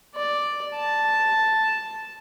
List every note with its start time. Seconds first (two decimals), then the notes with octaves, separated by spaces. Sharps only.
0.16 D5
0.75 A5